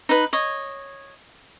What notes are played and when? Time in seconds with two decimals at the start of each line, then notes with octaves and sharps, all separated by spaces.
0.09 D#4 B4
0.33 C#5 D#5